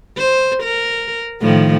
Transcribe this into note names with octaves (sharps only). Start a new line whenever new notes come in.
C5
A#4
A2 D#3 F3